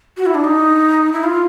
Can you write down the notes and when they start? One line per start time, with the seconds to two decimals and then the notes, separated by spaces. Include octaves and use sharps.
0.17 F#4
0.26 E4
0.35 D4
0.44 D#4
1.13 E4
1.24 F4